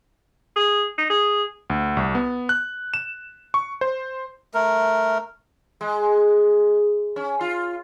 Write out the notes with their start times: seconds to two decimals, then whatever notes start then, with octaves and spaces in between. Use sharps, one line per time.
0.56 G#4
0.98 D#4
1.10 G#4
1.70 D2
1.97 C2
2.15 B3
2.49 F#6
2.94 E7
3.54 C#6
3.81 C5
4.54 A3 A#4
5.81 G#3
7.16 C#4
7.41 F4